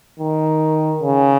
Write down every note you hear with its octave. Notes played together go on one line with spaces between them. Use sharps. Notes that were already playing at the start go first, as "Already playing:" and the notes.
D#3
C#3